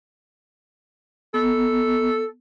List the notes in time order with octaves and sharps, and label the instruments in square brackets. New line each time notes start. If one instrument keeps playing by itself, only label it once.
[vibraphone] B3 [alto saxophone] A4